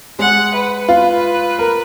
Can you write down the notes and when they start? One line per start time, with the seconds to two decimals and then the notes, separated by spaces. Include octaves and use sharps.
0.19 G#3 F#5
0.54 B4
0.89 F4
1.59 A#4